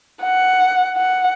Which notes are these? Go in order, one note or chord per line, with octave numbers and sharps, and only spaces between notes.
F#5
F#5